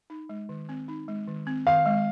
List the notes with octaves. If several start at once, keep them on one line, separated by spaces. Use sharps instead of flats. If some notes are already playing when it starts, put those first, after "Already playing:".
D#4
G#3
D#3
C4
D#4
G#3
D#3
C4
D#3 F5
G#3